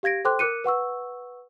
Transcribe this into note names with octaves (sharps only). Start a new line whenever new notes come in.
G4 F5 G#6 A#6 D7
A4 C5 G5 C6 D6 F#6
A#4 D6 F#6 C#7 D#7
B4 F#5 C#6 E6